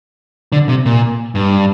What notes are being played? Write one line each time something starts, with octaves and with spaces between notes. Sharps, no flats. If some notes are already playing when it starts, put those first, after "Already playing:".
D3
C3
A#2
G2